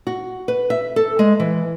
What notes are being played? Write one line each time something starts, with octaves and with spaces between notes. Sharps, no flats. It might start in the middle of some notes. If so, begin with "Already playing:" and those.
F#4
B4
E5
A4
G#3
E3